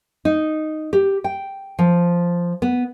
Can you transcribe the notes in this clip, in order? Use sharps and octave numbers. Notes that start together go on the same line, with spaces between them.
D#4
G4
G5
F3
B3